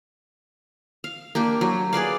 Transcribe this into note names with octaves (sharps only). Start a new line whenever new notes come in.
F5
A#3 D4 G4
F#3
G#4 B4 D5 F5